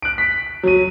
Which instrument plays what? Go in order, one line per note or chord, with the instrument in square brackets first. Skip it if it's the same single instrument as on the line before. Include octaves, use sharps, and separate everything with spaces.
[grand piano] F#6 D7
B6
F#3 D#7